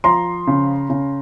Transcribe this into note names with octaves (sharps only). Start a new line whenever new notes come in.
F3 A#5 C6
C#3
C#3